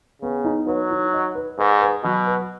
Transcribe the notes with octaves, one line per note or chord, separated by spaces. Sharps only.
C#3 B3
D#4
F#3 B4
D#4
D#5
B4
G#2 B4
B4
B2 F#3
B4